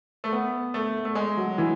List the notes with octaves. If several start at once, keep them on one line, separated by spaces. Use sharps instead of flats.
A3
B3
A3
A3
G#3
F#3
E3